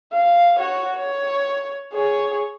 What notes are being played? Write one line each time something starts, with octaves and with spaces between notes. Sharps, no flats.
F5
F#4 C#5
C#5
G#4 C#5